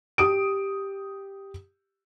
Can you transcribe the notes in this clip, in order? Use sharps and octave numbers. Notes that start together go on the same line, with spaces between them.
G4 D#6 D7